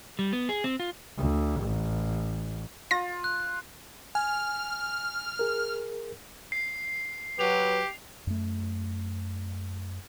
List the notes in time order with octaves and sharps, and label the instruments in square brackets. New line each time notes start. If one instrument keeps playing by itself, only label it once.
[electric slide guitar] G3
B3
G#4
C4
F4
[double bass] D2
A1
[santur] F4 [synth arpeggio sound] A#6
[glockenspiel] F#6
[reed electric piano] G#5 [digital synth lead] F6
[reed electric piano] G#4 A#4
[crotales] C7
[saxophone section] F#3 B4 [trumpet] G4 [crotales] F7
[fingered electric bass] F#2 A3